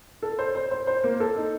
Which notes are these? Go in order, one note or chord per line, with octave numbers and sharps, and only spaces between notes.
A4
C5
C5
C5
C5
A#3
A4
D#4